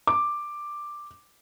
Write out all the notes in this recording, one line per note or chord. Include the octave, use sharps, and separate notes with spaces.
D6